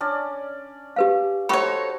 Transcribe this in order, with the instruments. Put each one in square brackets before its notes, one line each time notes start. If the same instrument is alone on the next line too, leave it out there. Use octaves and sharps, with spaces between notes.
[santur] C#4 D4 D5
[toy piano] G4 B4 F5
[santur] D#4 F#4 C5 [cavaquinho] A4 C#5 [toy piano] B5 C#6